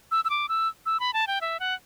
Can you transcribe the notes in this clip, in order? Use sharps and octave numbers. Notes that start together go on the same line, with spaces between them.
E6
E6
D6
E6
E6
B5
A5
G5
E5
F#5